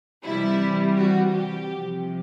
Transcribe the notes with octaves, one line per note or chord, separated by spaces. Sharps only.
C3 E3 G3 E4
F#4
G4
C3 F3